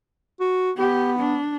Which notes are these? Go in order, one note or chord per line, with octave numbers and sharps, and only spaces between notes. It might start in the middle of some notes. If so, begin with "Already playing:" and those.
F#4
B3 G4
D4